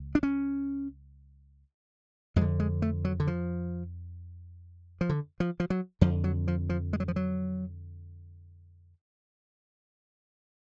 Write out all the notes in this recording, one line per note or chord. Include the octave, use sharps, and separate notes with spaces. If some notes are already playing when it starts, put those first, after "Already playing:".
Already playing: C#2
D4
C#4
F2 G#3
D3
G#3
A3
F#3
D3
F3
F3
D3
F3
F3
F#3
F2 D3 F3
F#3
F3
F3
G#3
F#3
F3
F#3